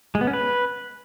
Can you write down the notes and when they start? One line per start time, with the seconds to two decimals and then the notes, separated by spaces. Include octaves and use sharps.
0.15 G#3
0.21 B3
0.27 C#4
0.33 B4